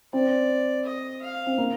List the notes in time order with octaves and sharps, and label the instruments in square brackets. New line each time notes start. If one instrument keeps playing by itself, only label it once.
[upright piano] C4 [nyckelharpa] D5
[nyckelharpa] D#5
F5
[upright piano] C4
A#3